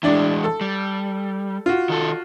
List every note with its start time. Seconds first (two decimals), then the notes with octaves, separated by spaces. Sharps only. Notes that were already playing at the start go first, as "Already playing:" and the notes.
0.03 A2 E3 G#3 D4 D5
0.44 A4
0.61 G3
1.66 F4 F#4
1.89 D#3 A4